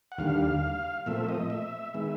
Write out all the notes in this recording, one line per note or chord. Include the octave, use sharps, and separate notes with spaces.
F#5
D#2 D3 G3 F5
A#2 F3 A3 C4 E5
D#5
E5
D#3 G#3 B3